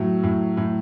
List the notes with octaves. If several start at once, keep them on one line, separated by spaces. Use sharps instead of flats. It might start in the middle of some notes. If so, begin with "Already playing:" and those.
Already playing: A2 F#3
A2
A2